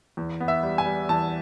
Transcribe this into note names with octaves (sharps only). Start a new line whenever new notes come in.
E2
B3
E5
G3
G#5
G3
E2 A5